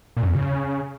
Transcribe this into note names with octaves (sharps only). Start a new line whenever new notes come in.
A#2
F#2
E2
C#3